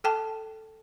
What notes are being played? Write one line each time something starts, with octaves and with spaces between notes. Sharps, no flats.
A4 G5 A5